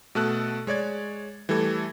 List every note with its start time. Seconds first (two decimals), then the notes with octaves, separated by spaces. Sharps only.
0.15 B2 A3 A4 F#6
0.67 G#3 C#5 D5 G#6
1.49 E3 G3 A3 A4 G#6